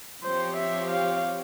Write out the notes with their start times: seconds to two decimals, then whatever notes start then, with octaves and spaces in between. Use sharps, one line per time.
0.23 F3 C4 G4 C5 C#5
0.57 E5
0.91 F5